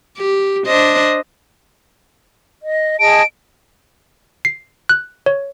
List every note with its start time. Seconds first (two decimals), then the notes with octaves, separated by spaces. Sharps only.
0.17 G4
0.67 D4 C5 D#5
2.60 D#5
3.00 G#4 D#5 A5 D7
4.45 C7
4.89 F#6
5.26 C#5